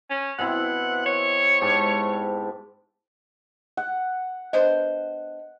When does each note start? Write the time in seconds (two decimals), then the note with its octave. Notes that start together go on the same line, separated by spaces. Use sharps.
0.10 C#4
0.39 B2 C4 E4 F#5
1.06 C#5
1.61 G#2 G4 A5
3.77 F#5
4.53 B3 D4 C5 D#5